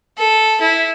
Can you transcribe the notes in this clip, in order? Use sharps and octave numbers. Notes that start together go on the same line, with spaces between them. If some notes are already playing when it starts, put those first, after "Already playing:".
A4
E4